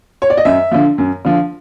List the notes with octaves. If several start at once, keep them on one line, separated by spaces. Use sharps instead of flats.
C#5
D5
D#5
F#2 E5
D3 F3
F#2
D3 F3